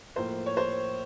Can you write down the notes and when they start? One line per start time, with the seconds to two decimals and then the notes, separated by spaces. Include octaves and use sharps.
0.16 A2 F3 A#3 C5
0.46 C#5
0.57 C5